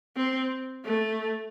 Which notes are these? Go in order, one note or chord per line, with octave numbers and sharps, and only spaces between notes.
C4
A3